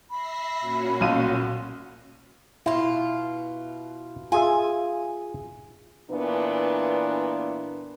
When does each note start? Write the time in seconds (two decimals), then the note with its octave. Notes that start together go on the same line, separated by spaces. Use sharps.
0.10 E5 B5 A#6 C7
0.61 A#2 C#4 F#4
1.01 B1 F4 C6 D#7
2.66 B2 E4 F4
4.32 F4 G#4 E5 G#5
6.11 A#2 E3 B3 D4